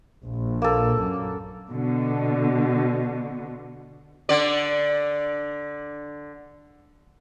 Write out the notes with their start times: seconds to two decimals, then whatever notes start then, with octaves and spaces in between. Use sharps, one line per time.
0.24 A#1
0.62 A#3 A4
1.01 F#2
1.69 B2 D3
4.29 D3 D5